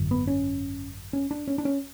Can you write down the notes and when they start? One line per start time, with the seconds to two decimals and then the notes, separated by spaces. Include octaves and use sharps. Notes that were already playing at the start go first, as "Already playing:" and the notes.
Already playing: G#1 F#2 D3
0.11 B3
0.27 C#4
1.13 C#4
1.31 D4
1.48 C#4
1.58 D4
1.65 C#4